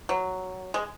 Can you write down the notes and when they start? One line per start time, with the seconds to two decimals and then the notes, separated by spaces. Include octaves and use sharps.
0.09 F#3
0.74 G#3